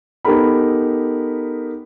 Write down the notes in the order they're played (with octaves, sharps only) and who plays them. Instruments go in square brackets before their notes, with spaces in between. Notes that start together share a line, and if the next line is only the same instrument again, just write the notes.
[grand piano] B3 D#4 G4 A4 A#4 B5